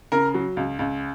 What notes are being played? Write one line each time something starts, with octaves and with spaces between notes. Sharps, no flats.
C#3 A#4
F#3
C#2
C#2